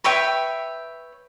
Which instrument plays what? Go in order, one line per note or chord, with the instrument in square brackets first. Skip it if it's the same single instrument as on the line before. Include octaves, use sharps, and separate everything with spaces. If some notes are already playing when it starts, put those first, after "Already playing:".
[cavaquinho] B4 C#5 E5 G5